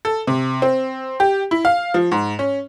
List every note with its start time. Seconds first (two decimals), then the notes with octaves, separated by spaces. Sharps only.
0.05 A4
0.27 C3
0.62 C4
1.20 G4
1.51 E4
1.65 F5
1.94 F3
2.12 G#2
2.39 C#4